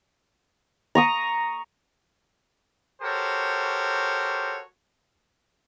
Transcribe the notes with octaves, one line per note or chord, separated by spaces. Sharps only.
A#5 C#6 D#6
F#4 G4 A4 A#4 C5 C#5